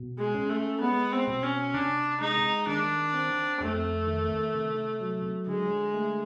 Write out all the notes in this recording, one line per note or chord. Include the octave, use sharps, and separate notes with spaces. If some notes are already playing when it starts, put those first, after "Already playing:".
Already playing: B2
G#3
C#4
A3
G#3 B3
C4
B2
C#4
C3 D4
G#3 D#4
D#3 D4
C4
F2 A3
D#3
C3
F#3
D3 G#3
A3